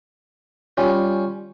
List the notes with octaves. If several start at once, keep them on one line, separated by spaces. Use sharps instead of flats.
G3 C#4 F4